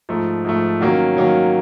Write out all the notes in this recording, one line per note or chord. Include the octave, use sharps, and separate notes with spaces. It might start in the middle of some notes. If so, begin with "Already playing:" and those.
G#2 F3 A3
G#2 F3 A3
D#3 F#3 A#3 C#4
D#3 F#3 A#3 C#4